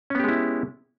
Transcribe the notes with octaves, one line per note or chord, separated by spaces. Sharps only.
G#3 B3 C#4 E4 G4